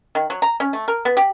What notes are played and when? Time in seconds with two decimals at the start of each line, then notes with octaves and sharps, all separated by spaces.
0.15 D#3
0.30 F#3
0.42 A#5
0.60 C#4
0.73 A3
0.88 A#4
1.05 B3
1.17 G4